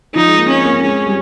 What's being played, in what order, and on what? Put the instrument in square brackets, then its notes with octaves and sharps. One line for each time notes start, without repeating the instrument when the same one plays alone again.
[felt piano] F3 [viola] D#4
[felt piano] G#3
A#3
[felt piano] C4 [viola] C#4
[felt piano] A#3
[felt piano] G#3 [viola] C#4
[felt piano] G3